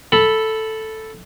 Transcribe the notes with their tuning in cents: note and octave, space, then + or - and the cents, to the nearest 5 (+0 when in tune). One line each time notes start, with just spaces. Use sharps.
A4 +0 B5 +0